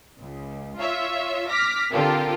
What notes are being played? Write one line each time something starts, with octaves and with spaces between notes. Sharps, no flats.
C#2
F4 C#5 E5
D6 F6 A#6 B6
D3 C4 F4 G4 A4 A#4